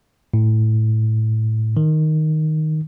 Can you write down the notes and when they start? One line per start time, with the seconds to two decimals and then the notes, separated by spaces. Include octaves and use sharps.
0.34 A2
1.77 D#3